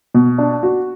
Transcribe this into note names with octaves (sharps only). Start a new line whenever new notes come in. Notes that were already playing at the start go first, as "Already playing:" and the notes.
B2
D4
F#4